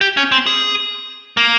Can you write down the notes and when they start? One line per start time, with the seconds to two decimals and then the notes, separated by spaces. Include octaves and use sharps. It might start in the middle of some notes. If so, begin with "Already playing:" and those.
0.01 G4
0.17 C#4
0.32 C4
0.46 G#4
1.37 A#3